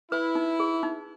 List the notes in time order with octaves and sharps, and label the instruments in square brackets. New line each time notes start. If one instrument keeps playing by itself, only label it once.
[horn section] E4 [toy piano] B4
[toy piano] D#4
G#4
D#4